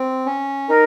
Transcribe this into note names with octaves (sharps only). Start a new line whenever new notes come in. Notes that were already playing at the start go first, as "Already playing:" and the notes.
Already playing: C4
C#4
D#4 A#4